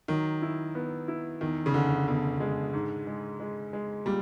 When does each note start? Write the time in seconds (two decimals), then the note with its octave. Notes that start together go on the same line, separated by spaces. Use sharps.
0.08 D#3 F#3
0.42 E4
0.75 B3
1.08 E4
1.41 E2 D#3
1.66 C#3
1.74 F1 D3
2.07 B2 D3
2.40 G#3
2.74 G#2
3.07 G#3
3.40 G#3
3.73 G#3
4.05 A#2 G3